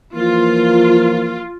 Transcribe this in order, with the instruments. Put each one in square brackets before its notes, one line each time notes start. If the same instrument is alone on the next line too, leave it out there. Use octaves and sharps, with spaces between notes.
[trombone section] E3 F3 A#3 [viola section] F4